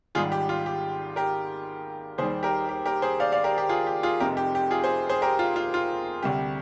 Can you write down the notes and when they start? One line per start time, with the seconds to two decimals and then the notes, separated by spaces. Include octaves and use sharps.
0.15 G#1 G#2 D#3 G3 F4 G#4
0.32 G4
0.49 F4
0.66 G4
1.16 G4 A#4
2.18 D#2 D#3 G3 G#4 C5
2.43 G4 A#4
2.69 G4
2.86 G4 A#4
3.02 G#4 C5
3.20 D5 F5
3.32 D5 F5
3.44 G4 A#4
3.58 G4
3.69 F4 G#4
3.87 G4
4.03 F4 G#4
4.20 F1 F2 C3 G4 A#4
4.37 G4
4.55 G4
4.71 F4 G#4
4.84 G#4 C5
5.09 G#4 C5
5.22 G4 A#4
5.39 F4
5.56 F4
5.74 F4
6.23 D2 C3 G3 G4